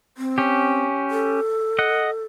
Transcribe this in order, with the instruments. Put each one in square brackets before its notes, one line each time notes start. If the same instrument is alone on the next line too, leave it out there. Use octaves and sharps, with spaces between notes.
[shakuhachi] C4
[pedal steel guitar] C#4 G4
[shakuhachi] A4
[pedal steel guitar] D#5 F#5